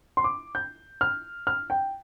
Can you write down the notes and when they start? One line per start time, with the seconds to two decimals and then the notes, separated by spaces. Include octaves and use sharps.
0.17 C6
0.24 D6
0.55 G6
1.01 F6
1.47 F6
1.70 G5